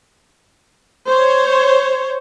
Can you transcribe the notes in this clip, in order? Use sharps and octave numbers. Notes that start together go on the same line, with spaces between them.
C5 C#5